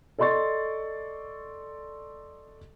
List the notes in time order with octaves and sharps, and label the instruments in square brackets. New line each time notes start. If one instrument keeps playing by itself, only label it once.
[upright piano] A4 D5 D#5 C6 C#6 A6